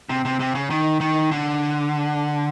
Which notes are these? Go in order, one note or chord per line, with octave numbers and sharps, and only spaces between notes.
C3
C3
C3
C#3
D#3
D#3
D3